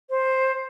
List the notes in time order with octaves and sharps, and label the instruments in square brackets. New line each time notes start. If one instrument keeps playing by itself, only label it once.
[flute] C5